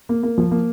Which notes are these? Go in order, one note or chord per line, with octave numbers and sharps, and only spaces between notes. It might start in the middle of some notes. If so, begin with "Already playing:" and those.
A#3
A#3
F3
A#3